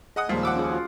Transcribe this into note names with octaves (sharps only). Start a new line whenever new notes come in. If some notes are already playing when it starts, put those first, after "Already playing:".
G#4 D#5 F#5 D#6
D#2 A#2 F3 G3 G#3 F4
F#5 D6 E6
C#4 F4 G#4
F4 F#4